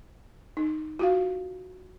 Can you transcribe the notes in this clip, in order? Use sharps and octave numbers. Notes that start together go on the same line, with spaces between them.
D#4
F4 F#4 F5